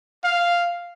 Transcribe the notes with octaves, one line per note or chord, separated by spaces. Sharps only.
F5